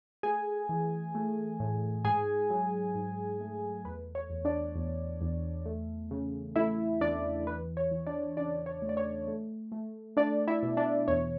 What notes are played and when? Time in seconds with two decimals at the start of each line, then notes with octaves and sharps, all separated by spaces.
0.23 A3 G#4 G#5
0.69 E3
1.15 A3
1.60 A2
2.04 G#2 G#4 G#5
2.50 F#3
2.95 G#2
3.41 A3
3.85 E2 B4
4.15 C#5
4.30 E2
4.45 D4 D5
4.75 E2
5.21 E2
5.65 A3
6.11 C#3
6.56 A3 E4 E5
7.01 E2 D4 D5
7.46 E3 B4
7.77 C#5
7.91 E3
8.07 D4 D5
8.37 C#3 D4 D5
8.66 C#5
8.82 A3
8.89 D5
8.97 C#5
9.28 A3
9.72 A3
10.17 A3 D4 D5
10.48 E4 E5
10.63 B2
10.77 D4 D5
11.08 E2 C#5